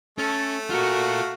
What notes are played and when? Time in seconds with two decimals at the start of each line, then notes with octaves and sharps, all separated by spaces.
0.18 A3 C#4 A4
0.70 F4 F#4 A#4 F5